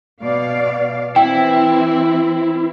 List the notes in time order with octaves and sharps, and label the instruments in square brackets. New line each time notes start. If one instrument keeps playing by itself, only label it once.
[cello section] B2 D5 F5
[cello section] E3 C4 [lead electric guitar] E4 [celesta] G5